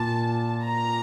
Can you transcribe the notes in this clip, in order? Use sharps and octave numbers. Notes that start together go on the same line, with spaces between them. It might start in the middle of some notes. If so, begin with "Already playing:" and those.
Already playing: A#2 A#3 A5
A#5